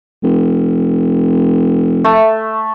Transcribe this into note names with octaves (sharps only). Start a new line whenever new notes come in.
F1
A3